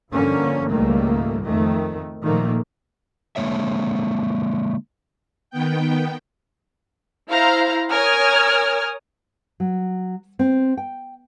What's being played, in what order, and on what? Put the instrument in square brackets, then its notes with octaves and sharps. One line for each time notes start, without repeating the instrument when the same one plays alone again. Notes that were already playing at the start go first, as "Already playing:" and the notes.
[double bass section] G2 D3 F3 A#3 C#4
C#2 G#2 D#3 G3 A3 A#3
F2 D#3 A3
A#2 D#3 F3 A3 A#3
[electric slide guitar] D3 G#3 A#3 C#5 E5
[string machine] D#3 B3 G5
[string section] E4 C5 F5 A#5
A#4 C#5 G#5 D#6 F6 G#6
[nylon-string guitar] F#3
C4
G5